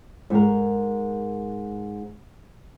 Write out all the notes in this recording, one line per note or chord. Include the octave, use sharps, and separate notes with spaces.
G#2 A#4